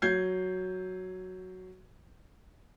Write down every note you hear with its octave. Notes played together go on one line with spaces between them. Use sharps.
F#3 G6 G#6 C7